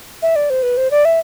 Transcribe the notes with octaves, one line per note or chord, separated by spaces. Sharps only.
E5
D5
C5
B4
C5
D5
E5